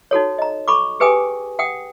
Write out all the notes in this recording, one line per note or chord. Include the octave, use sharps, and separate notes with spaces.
D#4 F#4 A4 C#5
D#5 A#5
A4 B5 C#6 D6
G4 G#4 B4 G5 G#5 D#6
F#5 G5 D#6